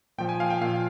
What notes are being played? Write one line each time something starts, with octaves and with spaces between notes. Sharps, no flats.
A#2 F3 G5
G#5
F5
G5
A#2 F3 F5